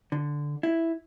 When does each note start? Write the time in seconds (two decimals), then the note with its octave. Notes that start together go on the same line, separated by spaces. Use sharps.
0.12 D3
0.63 E4